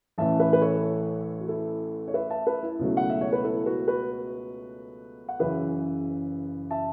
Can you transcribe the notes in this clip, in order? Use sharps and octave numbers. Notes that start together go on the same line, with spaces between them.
A1 A2 E3 E5 A5
B4 E5
B4
A4 C#5
F#4
E4 A4
C#5
B4 E5
E5 A5
B4 E5
E4
C#2 B2 F#3 A3
F#5
E5
C#5
B4
E4 A4
F#4 B4
F#4 B4
F#5
F#1 F#2 C#3 E3 B4 E5
E5 A5